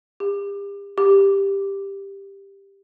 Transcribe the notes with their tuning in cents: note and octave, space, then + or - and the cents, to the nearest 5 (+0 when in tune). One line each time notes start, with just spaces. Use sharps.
G4 +40
G4 +10